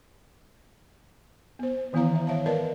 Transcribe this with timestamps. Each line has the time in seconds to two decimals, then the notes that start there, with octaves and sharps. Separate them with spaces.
1.59 B3 C5
1.93 D#3 E3 B3 E4 F5 A#5
2.15 E5
2.27 C#5 E5 F5 A5
2.46 A#4 B4 D5 D#5 F5 A5